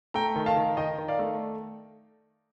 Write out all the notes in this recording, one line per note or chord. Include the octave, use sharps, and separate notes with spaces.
A3 G5 A#5
D#3
F5 A5
D#3
D#3 D#5 G5
D#3
D5 F5
A3